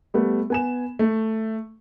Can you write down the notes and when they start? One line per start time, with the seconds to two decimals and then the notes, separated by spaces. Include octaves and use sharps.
0.14 G3 A3 B3
0.50 B3 G#5 E7
0.99 A3